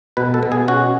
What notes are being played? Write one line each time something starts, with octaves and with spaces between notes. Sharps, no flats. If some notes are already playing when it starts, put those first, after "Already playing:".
B2 B4
A4
B2
G#4
C#4 F#4